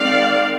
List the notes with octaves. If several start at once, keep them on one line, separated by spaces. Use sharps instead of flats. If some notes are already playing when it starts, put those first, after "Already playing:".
Already playing: D#3 G#3 C4 D5 F5